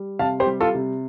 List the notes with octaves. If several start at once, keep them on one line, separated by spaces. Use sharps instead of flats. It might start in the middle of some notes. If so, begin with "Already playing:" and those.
Already playing: G3
C3 F5 A5
G4 C5
G3
F4 A4
C3